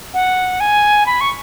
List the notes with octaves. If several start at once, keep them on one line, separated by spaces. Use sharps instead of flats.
F#5
G#5
B5
C#6